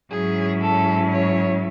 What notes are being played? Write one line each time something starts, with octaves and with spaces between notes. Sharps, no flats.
G#2 F#3 C#4 E4 G#4
A4
C#5